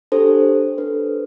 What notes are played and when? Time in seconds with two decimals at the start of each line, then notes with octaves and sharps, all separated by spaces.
0.12 D4 G4 A4 C5
0.78 D4 A4 B4